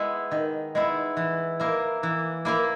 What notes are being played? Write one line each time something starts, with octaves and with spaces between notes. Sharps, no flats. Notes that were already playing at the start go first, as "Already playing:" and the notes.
Already playing: G#3 B3 E4
D#3
G#3 B3 E4
E3
A#3 E4 A#4
E3
A#3 E4 A#4